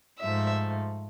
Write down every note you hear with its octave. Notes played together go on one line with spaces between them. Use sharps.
G#2 F3 A3 E5